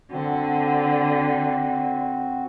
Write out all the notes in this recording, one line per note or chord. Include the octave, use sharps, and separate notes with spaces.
D3 C4 F#4